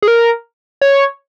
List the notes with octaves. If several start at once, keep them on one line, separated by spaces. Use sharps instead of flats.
G#4
A#4
C#5